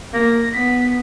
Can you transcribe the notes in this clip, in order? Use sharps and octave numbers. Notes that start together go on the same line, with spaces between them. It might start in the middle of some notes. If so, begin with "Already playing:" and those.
A#3 A#6
B3 B6